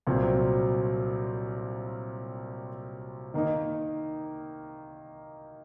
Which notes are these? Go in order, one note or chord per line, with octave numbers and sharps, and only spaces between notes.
C2 A#2 F#3 C4 F4
D#3 A#3 D#4